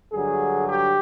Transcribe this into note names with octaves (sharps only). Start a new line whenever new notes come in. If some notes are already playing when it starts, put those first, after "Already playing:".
G2 D3 F#3 G#4
G4